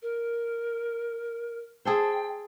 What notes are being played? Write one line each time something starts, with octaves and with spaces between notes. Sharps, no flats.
A#4
G#4 A4 C5 G5